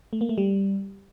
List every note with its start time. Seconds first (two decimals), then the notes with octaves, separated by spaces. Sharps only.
0.13 A3
0.21 A#3
0.29 A3
0.38 G3